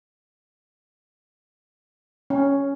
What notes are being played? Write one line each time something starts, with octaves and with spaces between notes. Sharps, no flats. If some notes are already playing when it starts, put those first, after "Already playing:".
C#4